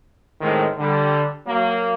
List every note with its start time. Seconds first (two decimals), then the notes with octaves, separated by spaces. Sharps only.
0.41 A2 D#3 G#3 C4
0.77 D3 G3
1.46 F#3 A#3